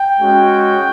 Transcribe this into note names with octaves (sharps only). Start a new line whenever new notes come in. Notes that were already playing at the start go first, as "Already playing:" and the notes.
Already playing: G5
G#3 C#4 F#4